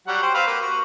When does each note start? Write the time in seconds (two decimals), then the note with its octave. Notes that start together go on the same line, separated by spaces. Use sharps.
0.07 F#3 G3 F#5
0.22 C5 G5
0.34 C4 B4 F5
0.47 A#3 B4
0.61 F#4